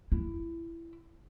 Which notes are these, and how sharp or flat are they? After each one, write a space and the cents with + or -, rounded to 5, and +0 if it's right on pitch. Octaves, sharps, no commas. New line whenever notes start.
E4 +20